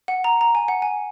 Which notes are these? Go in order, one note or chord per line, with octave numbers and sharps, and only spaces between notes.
F#5
A#5
A#5
G#5
F#5
G#5